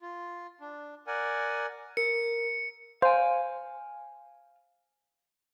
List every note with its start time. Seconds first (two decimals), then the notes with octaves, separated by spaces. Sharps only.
0.02 F4
0.61 D4
1.07 A#4 D5 F#5 G#5
1.97 A#4 C#7
3.02 C5 F5 G#5